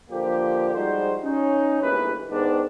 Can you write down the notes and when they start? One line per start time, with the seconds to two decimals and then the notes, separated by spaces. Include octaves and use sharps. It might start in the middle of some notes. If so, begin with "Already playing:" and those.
0.10 D3 F3 A#3 G4
0.74 F3 G3 G#3 D#4 F#4 C5
1.23 C#4 D#4
1.82 G1 D#2 G#2 D#3 E3 B4
2.30 G#2 D#3 B3 D4